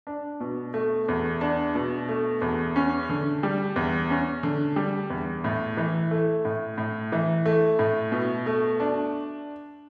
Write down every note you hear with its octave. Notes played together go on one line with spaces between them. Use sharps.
D4
B2
A3
E2
D4
B2
A3
E2
C#4
D3
G3
E2
C#4
D3
G3
E2
A2
E3
A3
A2
A2
E3
A3
A2
B2
A3
D4